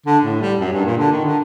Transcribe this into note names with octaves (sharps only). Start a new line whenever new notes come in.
D3
A2
G3
F#2
G2
A#2
D3
D#3
D3